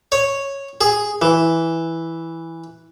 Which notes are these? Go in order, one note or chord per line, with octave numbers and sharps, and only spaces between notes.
C#5
G#4
E3